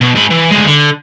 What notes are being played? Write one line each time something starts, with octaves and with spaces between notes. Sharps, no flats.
B2
G#2 B5
E3
D2 G#3
D3